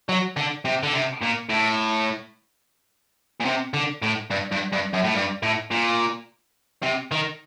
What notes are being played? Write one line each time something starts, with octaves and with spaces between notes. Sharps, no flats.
F#3
D3
C3
D3
C3
A#2
A2
A#2
C3
D3
A2
G2
G2
G2
F#2
A2
G2
A2
A#2
C3
D#3